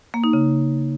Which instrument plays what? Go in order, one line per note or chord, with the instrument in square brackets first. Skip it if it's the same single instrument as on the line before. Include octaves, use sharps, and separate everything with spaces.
[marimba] A#3
D#4
C#3